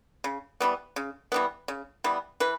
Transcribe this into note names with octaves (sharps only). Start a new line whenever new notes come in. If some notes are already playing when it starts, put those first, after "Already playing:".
C#3
E3 G3 B3
C#3
E3 G3 B3
C#3
E3 G3 B3
E3 B4